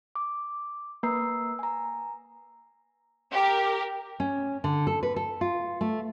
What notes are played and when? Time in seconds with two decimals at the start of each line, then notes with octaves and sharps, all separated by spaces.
0.15 D6
1.03 A#3 B4 A#5 E6 C7
1.59 G#5 A#5
3.31 G4 A#4
4.20 C#4
4.64 D3
4.87 A4
5.03 B4
5.16 A4
5.41 F4
5.81 A3